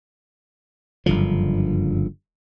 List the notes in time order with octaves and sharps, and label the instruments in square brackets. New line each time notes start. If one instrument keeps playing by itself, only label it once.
[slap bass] F#1 G2 D3 F3